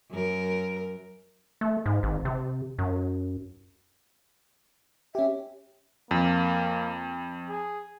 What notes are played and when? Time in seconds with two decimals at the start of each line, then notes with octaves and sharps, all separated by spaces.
0.11 F#2 A#4
1.61 A3
1.86 G#2
2.03 G#1
2.25 C3
2.79 F#2
5.15 C#4 G4 E5
6.11 F2 A#3
7.49 G#4